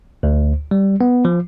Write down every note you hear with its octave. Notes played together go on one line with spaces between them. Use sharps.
D2
G3
B3
F3